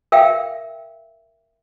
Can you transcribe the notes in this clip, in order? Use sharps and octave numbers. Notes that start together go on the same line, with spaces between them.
A#4 E5 F5 G5